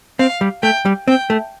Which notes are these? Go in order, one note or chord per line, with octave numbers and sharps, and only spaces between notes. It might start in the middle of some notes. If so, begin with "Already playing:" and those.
C4 F5
G3
A3 G5
G3
C4 G5
A3